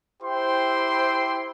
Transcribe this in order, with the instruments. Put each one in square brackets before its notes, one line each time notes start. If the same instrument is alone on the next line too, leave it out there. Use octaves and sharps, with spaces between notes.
[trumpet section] E4 G4 C5 G5 C6